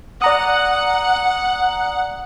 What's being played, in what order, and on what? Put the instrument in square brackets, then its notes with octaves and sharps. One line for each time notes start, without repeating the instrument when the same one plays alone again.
[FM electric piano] D5 A#5 D#6 [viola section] F#5